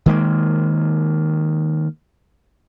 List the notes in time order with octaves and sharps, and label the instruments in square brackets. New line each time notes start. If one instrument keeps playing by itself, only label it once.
[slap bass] D#3 G#3 A#3